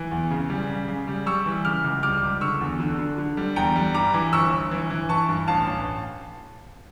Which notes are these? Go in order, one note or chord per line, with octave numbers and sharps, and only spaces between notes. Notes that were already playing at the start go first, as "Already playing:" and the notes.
Already playing: E3
E2
C#3
G3
C#3
C#3
G3
G3 C#6 E6
E3
C#3 D6 F6
C#2
G3 D6 F6
C#2
D3 C#6 E6
E2
D3
D3
D3
G3
E2 G5 A#5
G3
G2 A#5 D6
E3
G1 C#6 E6
G1
E3
E3
E3 A5 C#6
G2
A1 F5 A5
A1